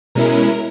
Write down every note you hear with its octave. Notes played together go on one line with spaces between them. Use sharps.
B2 G#3 C#4 E4 A#4